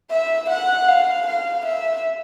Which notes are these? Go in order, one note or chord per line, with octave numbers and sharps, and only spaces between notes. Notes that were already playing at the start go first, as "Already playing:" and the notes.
E5
F#5
F5
F5
E5